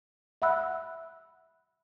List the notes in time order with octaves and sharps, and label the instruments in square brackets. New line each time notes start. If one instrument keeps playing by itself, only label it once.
[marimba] E5 F#5 B5 E6 F#6